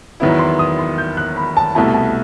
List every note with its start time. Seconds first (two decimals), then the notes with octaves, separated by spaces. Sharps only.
0.20 E2 D#3 F#3 B3 E4 B5
0.39 C6
0.59 D#6
0.79 C6
0.98 G6
1.17 F#6
1.36 B5
1.57 A5
1.75 C2 B2 A3 E4 A5
1.94 A5